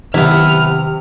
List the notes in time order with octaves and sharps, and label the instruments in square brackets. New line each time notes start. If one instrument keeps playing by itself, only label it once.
[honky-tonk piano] C3 [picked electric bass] D#3 F#3 [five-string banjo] B3 E4 [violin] F6